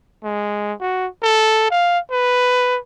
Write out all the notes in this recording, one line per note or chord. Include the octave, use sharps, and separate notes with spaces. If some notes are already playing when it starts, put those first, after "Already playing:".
G#3
F#4
A4
F5
B4